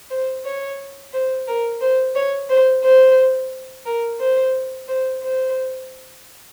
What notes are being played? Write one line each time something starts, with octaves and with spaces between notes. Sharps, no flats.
C5
C#5
C5
A#4
C5
C#5
C5
C5
A#4
C5
C5
C5